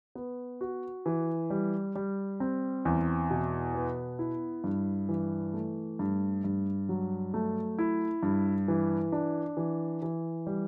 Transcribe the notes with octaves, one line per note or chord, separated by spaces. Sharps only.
B3
F#4
E3
G3
G3
C4
E2
B2
B3
E4
G2
E3
A3
G2
G2
F#3
A3
E4
G2
E3
D4
E3
E3
G3